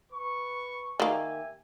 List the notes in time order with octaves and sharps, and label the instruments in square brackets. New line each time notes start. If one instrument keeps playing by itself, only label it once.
[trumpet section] B4 C#6
[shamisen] D#3 A#3 [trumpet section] G4 E5 G#5